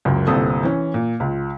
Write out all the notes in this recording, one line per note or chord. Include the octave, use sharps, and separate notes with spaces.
F#1 C#2 F#2
G1 C2 A#2 C4 A4 D#6
E3 C#4
A#2
C#2 F4